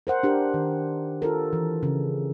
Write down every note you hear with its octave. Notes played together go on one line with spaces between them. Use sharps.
A#4 C5 F#5
D4 G4 A#4
D#3
F4 A4 A#4
E3
C#3